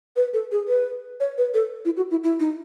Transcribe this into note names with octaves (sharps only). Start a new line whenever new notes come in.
B4
A4
G#4
B4
C#5
B4
A4
E4
F#4
E4
E4
D#4